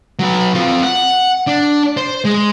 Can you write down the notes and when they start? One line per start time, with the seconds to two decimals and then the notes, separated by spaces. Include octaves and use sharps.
0.19 F#3 B4
0.55 C4 F4
0.83 F#5
1.47 D4
1.97 C5
2.25 G#3